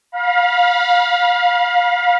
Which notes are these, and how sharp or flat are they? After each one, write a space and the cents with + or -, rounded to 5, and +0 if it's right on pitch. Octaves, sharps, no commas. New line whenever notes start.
F5 +25 B5 -35